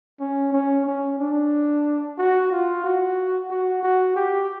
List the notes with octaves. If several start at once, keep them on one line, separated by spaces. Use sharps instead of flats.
C#4
C#4
C#4
D4
F#4
F4
F#4
F#4
F#4
G4